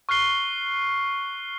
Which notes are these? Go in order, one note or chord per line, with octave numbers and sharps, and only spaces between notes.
C#6 F6 F#6 C7 G7